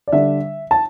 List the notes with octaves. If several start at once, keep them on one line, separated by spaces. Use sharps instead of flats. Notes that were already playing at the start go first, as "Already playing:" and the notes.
D5
D3 G3 D4 E5
A5